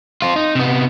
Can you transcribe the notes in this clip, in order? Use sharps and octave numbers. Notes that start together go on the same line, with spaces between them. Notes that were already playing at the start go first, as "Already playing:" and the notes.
C4 F4
D#4
C3 B3